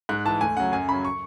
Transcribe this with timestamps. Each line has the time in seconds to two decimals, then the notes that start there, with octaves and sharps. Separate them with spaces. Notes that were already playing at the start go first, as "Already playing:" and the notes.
0.09 G#2 F#6
0.25 E3 A5
0.41 D2 G#5
0.57 C#3 F#3 F#5
0.72 F#2 G#5
0.88 C#3 F#3 B5
1.05 C#6